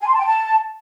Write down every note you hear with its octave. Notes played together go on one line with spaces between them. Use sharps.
G#5
C6
A5
G5
A5